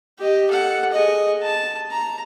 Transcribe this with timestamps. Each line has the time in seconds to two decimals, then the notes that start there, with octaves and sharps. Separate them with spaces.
0.18 G4 D#5
0.50 A4 F#5
0.92 G#4 D#5
1.42 A5
1.91 A#5